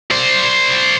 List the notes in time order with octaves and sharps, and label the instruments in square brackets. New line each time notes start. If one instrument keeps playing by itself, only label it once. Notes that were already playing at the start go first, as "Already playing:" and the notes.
[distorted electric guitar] C5 D5